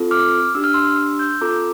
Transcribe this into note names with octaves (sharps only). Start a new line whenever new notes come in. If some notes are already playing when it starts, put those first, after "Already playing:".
Already playing: C4 F4 A4
D6 F6
D4 G4 E6
F6
C6 E6
C6 E6
E6 G6
C4 F4 A4 A#5 D6